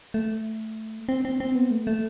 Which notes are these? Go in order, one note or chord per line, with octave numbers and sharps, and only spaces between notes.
A3
C4
C4
C4
B3
A3
A3